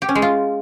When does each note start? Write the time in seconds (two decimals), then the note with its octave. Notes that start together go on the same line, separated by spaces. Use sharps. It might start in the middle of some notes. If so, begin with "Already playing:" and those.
0.02 G4
0.09 C#4
0.15 G#3
0.22 F4